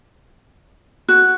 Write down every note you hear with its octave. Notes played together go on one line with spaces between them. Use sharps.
F#4 F#6